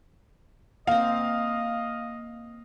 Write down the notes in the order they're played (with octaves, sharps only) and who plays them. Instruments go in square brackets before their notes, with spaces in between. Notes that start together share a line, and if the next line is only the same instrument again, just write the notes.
[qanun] A#3 C4 [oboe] D#5 [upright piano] F5